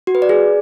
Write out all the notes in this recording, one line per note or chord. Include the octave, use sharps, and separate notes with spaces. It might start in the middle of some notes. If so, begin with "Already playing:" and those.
F#4
B4
D5
G#4